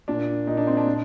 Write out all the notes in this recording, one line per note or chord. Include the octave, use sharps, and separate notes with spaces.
A#2 D4
A#2 D#4
D4
C4
D4
A#2